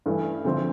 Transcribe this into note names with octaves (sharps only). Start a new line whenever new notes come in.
G2 E3 A3
D2 D3 F3 A3 C4